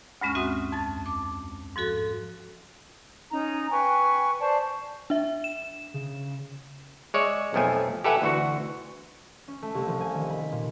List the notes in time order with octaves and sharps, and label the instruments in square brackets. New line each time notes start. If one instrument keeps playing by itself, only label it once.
[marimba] D2 G2 G#3 C#4 C#6 F6
C4 F#4 E5 F#5 D#6
F2 A5 A6
D6
G#2 F3 F#4 A4 A6
[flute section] C#4 D#4 A#5
B4 G5 G#5 C#6
C5 D5 A5 C#6
[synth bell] D4 E5
E7
[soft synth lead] C#3
[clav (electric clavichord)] G#3 C#5 D5 E5
B1 F2 F3 A3 G#5
G4 A4 B4 E5 F#5 G#5
D2 E3 F#4
[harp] C#4
A3
C2
F3
G#5
D#3
B5
A#2